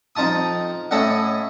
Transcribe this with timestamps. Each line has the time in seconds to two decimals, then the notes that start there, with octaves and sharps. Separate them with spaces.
0.16 F2 D#4 F4 A5 D#6
0.91 A2 C#4 A4 D#5 F#5